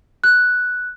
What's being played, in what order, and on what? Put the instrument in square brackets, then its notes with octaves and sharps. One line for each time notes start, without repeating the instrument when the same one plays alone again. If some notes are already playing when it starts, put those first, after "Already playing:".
[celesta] F#6